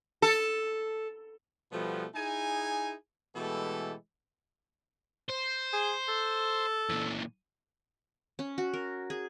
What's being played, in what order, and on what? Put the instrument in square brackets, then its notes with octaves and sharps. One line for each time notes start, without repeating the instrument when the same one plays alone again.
[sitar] A4
[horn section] B2 F3 G3 A3 B3
D#4 E4 G#4 G#5
B2 E3 G#3 A3 G4 A4
[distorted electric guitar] C5
[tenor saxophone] G#4
A4
[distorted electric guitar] A#2 E3
[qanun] C#4
F#4
A#4
G#4